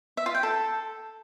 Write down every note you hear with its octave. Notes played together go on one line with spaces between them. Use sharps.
E5
F4
G5
A4